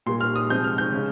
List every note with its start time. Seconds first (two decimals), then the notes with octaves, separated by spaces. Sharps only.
0.06 A#2 G3 A#3 C6
0.21 F6
0.36 D#6
0.50 C3 F3 G#3 G6
0.64 F6
0.78 G6
0.92 C#3 G#3